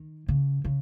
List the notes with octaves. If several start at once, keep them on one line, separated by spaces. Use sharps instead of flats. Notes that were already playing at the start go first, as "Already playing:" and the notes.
Already playing: D#3
C#3
C#3